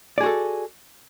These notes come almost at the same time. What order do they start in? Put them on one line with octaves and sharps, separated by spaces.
D5 G#4 F#4 A4